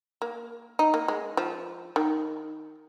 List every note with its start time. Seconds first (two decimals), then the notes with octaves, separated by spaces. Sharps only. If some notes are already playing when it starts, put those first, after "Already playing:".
0.22 A#3
0.79 D#4
0.94 A#3
1.08 G#3
1.37 F3
1.96 D#3